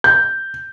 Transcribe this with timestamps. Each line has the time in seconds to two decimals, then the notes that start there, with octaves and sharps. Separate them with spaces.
0.04 G6